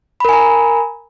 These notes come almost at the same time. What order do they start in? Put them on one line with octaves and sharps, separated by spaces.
B5 A#4 G#5 A#5